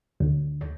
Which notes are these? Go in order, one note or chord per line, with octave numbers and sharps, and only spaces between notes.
D2